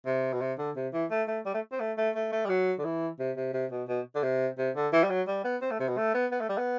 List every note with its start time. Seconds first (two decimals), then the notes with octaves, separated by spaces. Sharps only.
0.06 C3
0.33 B2
0.41 C3
0.58 D3
0.76 C3
0.93 E3
1.11 A3
1.28 A3
1.45 G3
1.54 A3
1.72 C4
1.80 A3
1.97 A3
2.15 A3
2.32 A3
2.45 G3
2.49 F#3
2.79 D3
2.84 E3
3.19 C3
3.37 C3
3.53 C3
3.71 B2
3.88 B2
4.15 D3
4.23 C3
4.58 C3
4.76 D3
4.93 E3
5.04 G3
5.10 F#3
5.28 G3
5.45 B3
5.62 C4
5.71 A3
5.80 C3
5.88 B2
5.97 A3
6.14 B3
6.32 B3
6.40 A3
6.49 G3
6.58 B3